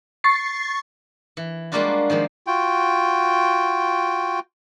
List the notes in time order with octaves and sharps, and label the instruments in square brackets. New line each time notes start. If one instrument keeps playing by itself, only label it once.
[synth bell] C#6 A6 C7
[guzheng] E3
G3 G#3 A#3 D4 F4 F#4
D#3 F3 G#3 A#3
[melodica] F4 F#4 G5